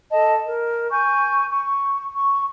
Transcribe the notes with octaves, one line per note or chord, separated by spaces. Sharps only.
A4 D#5 A5
A#4
G#5 C#6 G6
C#6
C#6